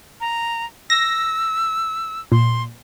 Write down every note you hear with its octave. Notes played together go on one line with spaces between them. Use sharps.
A#5
E6 A#6
A#2 C6